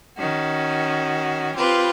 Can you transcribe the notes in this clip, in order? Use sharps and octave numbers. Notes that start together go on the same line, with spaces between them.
D#3 C#4 F#4
C4 F4 G4 B4